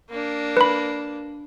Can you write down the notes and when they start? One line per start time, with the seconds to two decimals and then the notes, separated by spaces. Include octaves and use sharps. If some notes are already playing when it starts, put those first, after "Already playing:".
0.10 A#3 D4
0.57 B4 B5